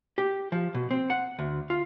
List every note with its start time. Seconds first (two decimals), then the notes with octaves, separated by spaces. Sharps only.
0.18 G4
0.52 F3
0.74 B2
0.91 C4
1.10 F#5
1.39 D2
1.70 F4